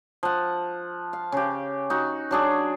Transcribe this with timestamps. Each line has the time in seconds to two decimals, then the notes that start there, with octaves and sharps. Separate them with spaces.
0.23 F3 F#5
1.13 F5
1.32 C#3 G4
1.90 D#4 F#4
2.31 F#3 D4 G#4